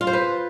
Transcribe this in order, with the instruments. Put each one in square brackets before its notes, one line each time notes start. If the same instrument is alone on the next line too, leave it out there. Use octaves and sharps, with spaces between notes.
[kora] F4
C5
B4